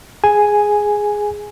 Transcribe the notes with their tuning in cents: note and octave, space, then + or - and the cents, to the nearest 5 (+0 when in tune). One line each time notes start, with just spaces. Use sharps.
G#4 +0 G#5 +0